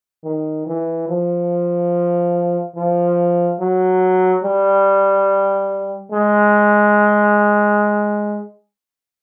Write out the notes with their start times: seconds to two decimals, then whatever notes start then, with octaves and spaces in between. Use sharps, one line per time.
0.24 D#3
0.67 E3
1.09 F3
2.76 F3
3.60 F#3
4.44 G3
6.12 G#3